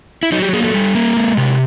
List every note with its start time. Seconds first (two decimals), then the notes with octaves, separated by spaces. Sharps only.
0.23 E4
0.32 F#3 D#4
0.42 G4
0.53 A#3 G#4
0.64 A4
0.74 G3
0.95 A#3
1.16 G#3
1.37 C3